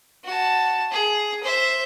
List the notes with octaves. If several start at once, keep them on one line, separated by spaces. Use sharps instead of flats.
F#4 A5
G#4
C5 E5